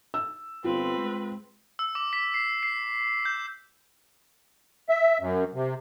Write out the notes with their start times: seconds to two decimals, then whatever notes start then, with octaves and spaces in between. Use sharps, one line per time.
0.14 E6
0.64 G1 C4 F4 B4
0.98 G#3
1.79 E6
1.95 D6
2.13 B6
2.34 C7
2.63 C7
3.25 G6
4.89 E5
5.20 F#2
5.54 C3